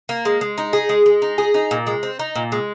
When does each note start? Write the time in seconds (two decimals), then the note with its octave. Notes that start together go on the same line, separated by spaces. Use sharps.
0.09 A#3
0.25 G#3
0.41 G#3
0.58 D#4
0.73 G#4
0.89 G#3
1.06 G#3
1.22 D#4
1.38 G#4
1.54 D#4
1.71 A#2
1.87 G#3
2.03 C4
2.19 D#4
2.36 A#2
2.52 G#3